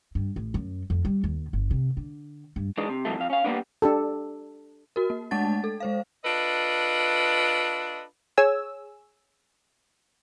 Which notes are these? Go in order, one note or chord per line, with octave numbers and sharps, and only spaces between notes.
G2
A1
F#2
F2
G3
D#2
G1
C3
D3
G2
E3 G#3 D4 D#4
C3
G#2 C3 D#3 E3 F#3 A3
F2 F5
C#4 F5
G3 A#3 B3 D4
D4 G4 A4
F#4 A#4
A#3
G#3 A3 D4 F#5 A5 A6
A4
G#3 C5 F5
D4 F4 A4 B4 D#5
G#4 C#5 G#5 E6